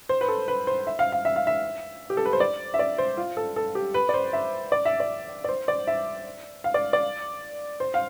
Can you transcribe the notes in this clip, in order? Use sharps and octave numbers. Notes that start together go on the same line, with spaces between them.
C5
B4
A4
B4
C5
E5
F5
F5
E5
F5
E5
G4
A4
B4
C5
D5
E5
D5
C5
F4
A4
A4
G4
B4
D5
C5
E5
D5
E5
D5
D5
C5
D5
E5
F5
D5
D5
C5
F5